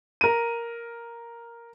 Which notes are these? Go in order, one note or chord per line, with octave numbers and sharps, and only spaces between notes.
A#4 D#7